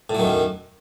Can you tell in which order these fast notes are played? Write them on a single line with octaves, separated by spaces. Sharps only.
A2 F#3 D#3 F#2